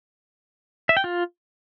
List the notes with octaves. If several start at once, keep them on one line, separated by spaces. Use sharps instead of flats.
E5
G5
F4